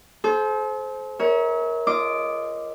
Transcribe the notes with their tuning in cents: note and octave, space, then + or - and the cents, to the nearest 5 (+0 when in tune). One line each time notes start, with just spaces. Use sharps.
A4 -45 C5 +0
A#4 +20 C#5 +0 E5 -40
F4 -20 D#5 +0 D6 +0